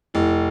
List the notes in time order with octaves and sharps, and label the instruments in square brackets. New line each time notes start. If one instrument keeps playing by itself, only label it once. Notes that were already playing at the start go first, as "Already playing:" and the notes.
[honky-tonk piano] F1 [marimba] E4